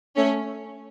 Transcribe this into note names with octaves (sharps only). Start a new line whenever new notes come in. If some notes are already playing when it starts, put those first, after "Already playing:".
A3 C#4